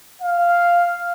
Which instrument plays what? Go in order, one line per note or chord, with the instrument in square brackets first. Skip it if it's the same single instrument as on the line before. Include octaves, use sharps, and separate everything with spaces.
[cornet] F5